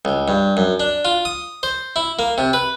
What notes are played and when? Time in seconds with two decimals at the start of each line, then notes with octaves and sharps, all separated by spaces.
0.05 C#2
0.28 G2
0.57 F#2
0.80 D4
1.05 F4
1.25 D#6
1.63 C5
1.96 E4
2.19 A#3
2.38 C3
2.53 B4